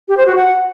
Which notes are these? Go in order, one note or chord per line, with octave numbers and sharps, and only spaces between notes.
G4
C5
F#4
F#5